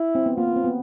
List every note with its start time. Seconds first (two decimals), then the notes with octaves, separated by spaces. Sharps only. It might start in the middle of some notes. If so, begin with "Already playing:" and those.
Already playing: E4
0.15 C4
0.26 B3
0.37 A#3 F4
0.56 C4
0.64 B3